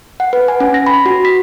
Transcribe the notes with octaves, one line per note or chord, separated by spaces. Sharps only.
F#5
B4
G#5
C#4
A#6
B5
F#4
B6